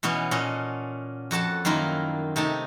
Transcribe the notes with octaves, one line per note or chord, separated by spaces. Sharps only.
B2 E3 B3 C#4 C#5
A#2 C#4 A4 D#5
F2 F#4 A4 A5
F#2 D#3 A#3 E4 F4
C3 A3 D#4 A5